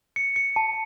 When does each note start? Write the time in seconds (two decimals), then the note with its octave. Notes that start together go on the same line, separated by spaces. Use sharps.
0.16 C#7
0.36 C#7
0.56 A5